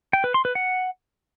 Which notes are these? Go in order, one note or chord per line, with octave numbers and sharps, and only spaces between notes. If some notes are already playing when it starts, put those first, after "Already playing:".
G5
B4
C6
B4
F#5